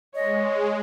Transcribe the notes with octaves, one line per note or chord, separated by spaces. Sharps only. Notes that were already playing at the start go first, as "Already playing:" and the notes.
G#3 C#5 D#5